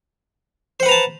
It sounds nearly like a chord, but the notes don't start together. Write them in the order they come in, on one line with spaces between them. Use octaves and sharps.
C5 F#5 B4 A#5 A5